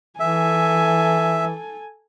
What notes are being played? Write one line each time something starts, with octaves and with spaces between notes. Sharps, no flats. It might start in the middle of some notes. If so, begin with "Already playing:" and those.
E3 A4 E5 G#5